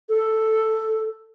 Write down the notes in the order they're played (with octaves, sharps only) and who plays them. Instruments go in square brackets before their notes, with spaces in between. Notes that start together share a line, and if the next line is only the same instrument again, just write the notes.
[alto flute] A4